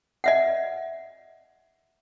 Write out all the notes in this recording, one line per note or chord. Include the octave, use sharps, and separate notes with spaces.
D#5 E5 F#5